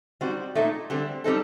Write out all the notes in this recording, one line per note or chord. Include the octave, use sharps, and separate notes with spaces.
G3 C4 D#4 F#4
A#2 A3 D#4
D3 G3 C4
G3 C4 D#4 A4